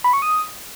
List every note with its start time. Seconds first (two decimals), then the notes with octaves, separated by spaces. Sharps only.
0.04 B5
0.13 C#6
0.22 D#6